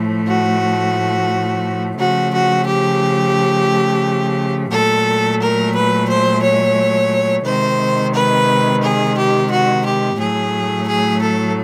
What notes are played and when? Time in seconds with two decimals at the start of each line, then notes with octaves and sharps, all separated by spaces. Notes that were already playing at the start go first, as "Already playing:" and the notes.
Already playing: A2 F3 A3
0.26 F#4
1.98 C#3 F3 A3 F#4
2.32 F#4
2.65 G4
4.70 A#2 F#3 A3 A4
5.40 A#4
5.73 B4
6.07 C5
6.41 C#5
7.44 C3 D#3 G#3 C5
8.13 B4
8.81 G#4
9.15 G4
9.49 F#4
9.83 G4
10.17 A2 F#3 A3 G#4
10.86 G#4
11.19 A4